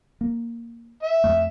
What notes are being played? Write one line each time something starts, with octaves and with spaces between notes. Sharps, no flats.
A#3
E5
F2 A3